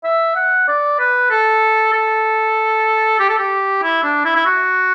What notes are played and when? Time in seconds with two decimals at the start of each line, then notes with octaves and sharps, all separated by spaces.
0.04 E5
0.35 F#5
0.68 D5
0.99 B4
1.30 A4
1.93 A4
3.19 G4
3.29 A4
3.38 G4
3.83 E4
4.03 D4
4.25 E4
4.35 E4
4.46 F#4